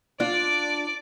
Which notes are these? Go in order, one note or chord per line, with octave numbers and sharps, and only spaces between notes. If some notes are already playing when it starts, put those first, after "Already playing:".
D4 F4 D5 D6